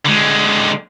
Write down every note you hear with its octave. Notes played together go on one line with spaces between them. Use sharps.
D3 G#3